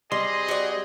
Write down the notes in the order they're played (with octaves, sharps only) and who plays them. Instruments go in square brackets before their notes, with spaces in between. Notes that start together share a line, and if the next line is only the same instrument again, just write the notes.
[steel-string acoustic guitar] G3 [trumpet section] C4 G#4 D#5 [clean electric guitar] C6
[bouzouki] F#4 D5